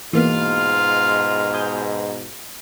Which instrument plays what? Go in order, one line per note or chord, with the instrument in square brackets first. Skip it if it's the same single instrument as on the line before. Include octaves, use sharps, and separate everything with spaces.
[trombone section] G#2 B2 [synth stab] E3 A#3 B3 [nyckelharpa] F4 F5
[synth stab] G#5 D#6 G6